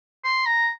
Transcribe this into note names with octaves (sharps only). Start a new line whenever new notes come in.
C6
A#5